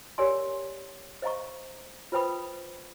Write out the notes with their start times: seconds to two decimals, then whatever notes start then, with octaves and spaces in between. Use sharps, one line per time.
0.18 G4 A#4 C#5 D5 G#5 C6
1.22 C5 D#5 F5 A#5 C#6
2.12 F4 B4 C5 G5 B5 D#6